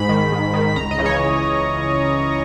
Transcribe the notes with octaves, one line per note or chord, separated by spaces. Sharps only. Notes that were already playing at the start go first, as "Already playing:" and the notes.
Already playing: G#2 B5
D#3
G#2
D#3
C#2 A#5
D#5
C#3 E3
C#5